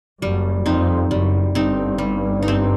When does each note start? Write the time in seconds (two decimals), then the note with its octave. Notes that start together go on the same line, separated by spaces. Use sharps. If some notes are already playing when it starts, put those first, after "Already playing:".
0.22 F#1 F#2 G3
0.66 F2 C4 D#4
1.10 F#1 F#2 G3
1.55 G1 G2 C4 D#4
1.98 G3
2.43 D#4
2.48 C4